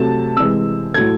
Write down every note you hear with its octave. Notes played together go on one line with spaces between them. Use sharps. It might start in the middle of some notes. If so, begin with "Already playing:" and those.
Already playing: C3 F#3 A3 A5
C3 E3 G#3 E6
A2 F#3 A3 G#6